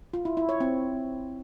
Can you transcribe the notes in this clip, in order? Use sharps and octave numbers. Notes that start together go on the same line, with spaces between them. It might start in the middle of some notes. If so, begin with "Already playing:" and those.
F4
E4
E4
C#5
C4